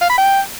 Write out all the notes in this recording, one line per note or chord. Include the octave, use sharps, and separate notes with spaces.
F5
B5
G5